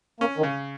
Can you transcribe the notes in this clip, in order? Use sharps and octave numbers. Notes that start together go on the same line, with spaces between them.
A#3 C#4
D#3
C#3